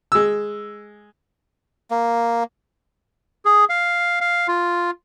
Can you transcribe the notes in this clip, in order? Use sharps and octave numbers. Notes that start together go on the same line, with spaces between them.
G#3 E6
A#3
G#4
F5
F5
F4